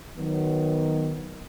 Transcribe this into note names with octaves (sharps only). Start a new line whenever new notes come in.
D#3 F#3 B3